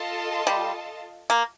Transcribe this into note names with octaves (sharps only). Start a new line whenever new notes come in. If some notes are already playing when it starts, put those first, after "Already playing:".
Already playing: F4 A4 D#5 A5
G3
A#3